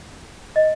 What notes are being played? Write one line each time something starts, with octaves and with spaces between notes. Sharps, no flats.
D#5